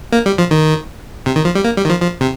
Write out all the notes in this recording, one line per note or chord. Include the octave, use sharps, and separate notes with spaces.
A#3
G3
F3
D#3
C3
D#3
F3
G3
A#3
G3
D#3
F3
F3
C3